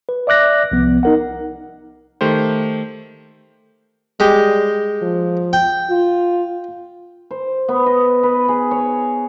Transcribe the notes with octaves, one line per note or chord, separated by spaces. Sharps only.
B4
D5 E5 D6 F#6 A#6
C2 F3 B3
D#4 A#4 F#5
D#3 A3 G4 C5
G3 G#3 G4
F3
G5
F4
C5
B3
D#5
B4
G#4
C#5